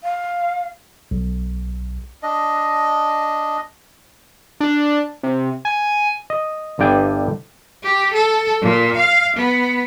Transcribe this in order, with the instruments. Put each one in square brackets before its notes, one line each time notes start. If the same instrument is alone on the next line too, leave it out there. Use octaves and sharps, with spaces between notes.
[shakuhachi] F5
[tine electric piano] B1
[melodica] D4 D#5
[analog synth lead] D4
C3
G#5
[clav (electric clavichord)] D#5
G1 G2 D5 G5 G#5
[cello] G4
A4
A#2
F5
B3